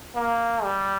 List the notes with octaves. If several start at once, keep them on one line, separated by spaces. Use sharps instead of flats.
A#3
G3